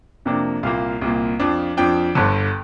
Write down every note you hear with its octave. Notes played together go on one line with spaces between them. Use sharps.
F2 C3 A#3 D4
C2 A#2 A#3 F5
C2 A#2 A#3
F2 F3 D4
F2 F3 D4 G5
G1 G2 D3